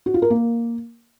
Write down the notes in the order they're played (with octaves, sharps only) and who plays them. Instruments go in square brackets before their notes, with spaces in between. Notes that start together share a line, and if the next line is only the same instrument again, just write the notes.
[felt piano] F#4
F4
A#4
A#3